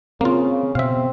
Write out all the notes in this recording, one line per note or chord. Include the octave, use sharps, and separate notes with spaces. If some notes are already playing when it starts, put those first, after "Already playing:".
C#3 A#3 C4 F4
B2 C4 E5 F5